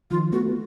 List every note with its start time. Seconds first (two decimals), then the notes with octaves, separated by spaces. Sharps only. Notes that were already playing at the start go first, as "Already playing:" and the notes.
0.11 D#3 F3 F4
0.32 A3 B3 F#4
0.48 B3